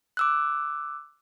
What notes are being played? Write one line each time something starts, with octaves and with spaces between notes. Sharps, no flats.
D6 E6 F#6